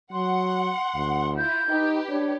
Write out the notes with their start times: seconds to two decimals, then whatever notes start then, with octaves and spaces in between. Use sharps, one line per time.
0.13 F#3 F#5 C6
0.95 D2
1.37 E4 F4 G6
1.68 D#4 G4 B4
2.09 D4 C#5